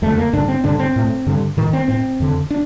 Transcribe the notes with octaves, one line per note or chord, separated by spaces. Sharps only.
F2 D3 A3
A#3
G2 D3 D4
C4
G2 D3 D4
C4
A2
G2 D3
A2 D#3
C4
A2 C4
F2 D3
D4